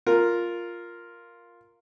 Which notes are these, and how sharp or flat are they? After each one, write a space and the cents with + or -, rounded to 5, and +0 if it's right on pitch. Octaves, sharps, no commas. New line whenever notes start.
F4 +0 A#4 +0